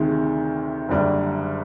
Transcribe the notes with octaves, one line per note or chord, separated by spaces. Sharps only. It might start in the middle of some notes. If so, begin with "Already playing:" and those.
Already playing: D2 C3 D#3 G#3
F#1 F#2 D3 G3